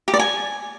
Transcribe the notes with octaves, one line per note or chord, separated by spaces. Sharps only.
G4
D5
G#5